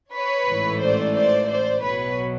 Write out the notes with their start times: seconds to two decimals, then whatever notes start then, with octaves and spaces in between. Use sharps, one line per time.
0.14 B4 C#5
0.48 A1 G#2 E3 A3
0.81 C5 D5
1.15 C5 D5
1.49 C5 D5
1.84 B1 B2 F#3 B4 C#5